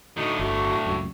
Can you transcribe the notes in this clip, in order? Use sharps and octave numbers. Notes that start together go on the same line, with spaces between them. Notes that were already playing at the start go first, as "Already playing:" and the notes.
A2 D3 D#4 F#4
G1 A3 F#4
C#2 F#2